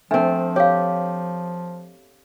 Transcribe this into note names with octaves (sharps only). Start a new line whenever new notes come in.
F3 A3 C4 D4
G4 C#5 F5